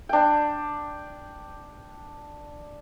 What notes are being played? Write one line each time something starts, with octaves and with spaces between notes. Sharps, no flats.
D4 G5